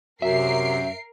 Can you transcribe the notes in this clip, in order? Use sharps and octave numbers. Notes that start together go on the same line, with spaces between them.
F#2 C3 A#4 E5 C7 D7